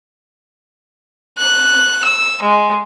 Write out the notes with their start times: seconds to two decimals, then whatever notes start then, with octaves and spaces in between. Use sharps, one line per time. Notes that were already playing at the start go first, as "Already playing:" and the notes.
1.38 F#6
2.05 E6
2.42 G#3